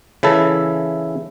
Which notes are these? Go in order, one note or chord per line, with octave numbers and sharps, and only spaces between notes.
C#3 E3 E4 A4